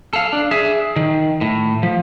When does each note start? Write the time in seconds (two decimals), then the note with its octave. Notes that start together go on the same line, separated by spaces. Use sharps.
0.13 A4 F5
0.33 D4
0.51 G#4 E5
0.96 D#3
1.41 A2
1.83 F3